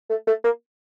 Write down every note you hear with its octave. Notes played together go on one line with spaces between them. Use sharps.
A3
A3
A#3